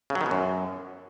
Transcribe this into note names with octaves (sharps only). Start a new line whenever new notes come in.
C#3
F#3
D#3
B2
F#2